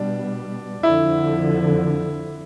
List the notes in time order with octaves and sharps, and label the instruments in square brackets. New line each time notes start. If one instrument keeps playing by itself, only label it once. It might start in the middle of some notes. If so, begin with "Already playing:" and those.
Already playing: [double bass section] B2 G3 B3 [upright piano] D4
[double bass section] F2 D3 F3 [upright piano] E4